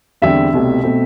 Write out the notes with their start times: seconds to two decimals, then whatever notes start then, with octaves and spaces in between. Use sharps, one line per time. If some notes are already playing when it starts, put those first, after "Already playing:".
0.22 E2 D3 G3 C4 E5
0.53 C2 B2 A3 C4
0.84 B2 A3 C4